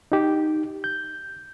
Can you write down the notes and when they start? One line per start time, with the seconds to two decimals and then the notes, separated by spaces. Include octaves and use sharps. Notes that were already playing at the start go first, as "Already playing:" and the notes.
0.12 D#4 G4
0.84 G6